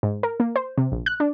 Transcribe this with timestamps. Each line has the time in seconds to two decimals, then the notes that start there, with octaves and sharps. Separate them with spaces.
0.03 G#2
0.23 A#4
0.40 A#3
0.56 C5
0.78 C3
0.92 A#1
1.06 F#6
1.20 D4